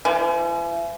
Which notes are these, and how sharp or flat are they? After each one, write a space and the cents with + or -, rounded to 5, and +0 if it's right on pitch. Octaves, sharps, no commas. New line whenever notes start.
E3 +45